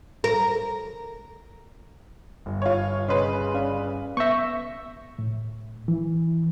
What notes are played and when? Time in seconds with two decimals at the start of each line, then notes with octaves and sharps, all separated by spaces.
0.24 A#4
2.46 G1
2.62 F4 C#5
3.08 C#3 B4 C#5 D#5 C6
3.54 C#4 D5 F5
4.17 B3 E5 C#6 G6 A#6
5.19 A2
5.88 E3